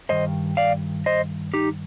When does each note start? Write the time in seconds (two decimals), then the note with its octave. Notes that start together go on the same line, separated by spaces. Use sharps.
0.09 G2 D#3 C5 D#5
0.57 D5 F5
1.06 C5 D#5
1.54 D#4 G4